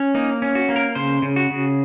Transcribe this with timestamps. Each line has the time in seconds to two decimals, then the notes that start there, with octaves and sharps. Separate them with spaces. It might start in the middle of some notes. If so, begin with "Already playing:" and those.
Already playing: C#4
0.15 A#3 D#4
0.42 C#4
0.55 F#4
0.69 A#3
0.76 A#4
0.95 C#3 C5
1.22 C#3
1.36 F#4
1.50 C#3